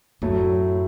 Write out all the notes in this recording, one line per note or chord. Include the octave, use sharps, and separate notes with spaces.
F#2 A2 F#3 A3 E4